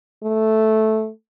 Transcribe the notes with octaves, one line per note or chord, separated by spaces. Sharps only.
A3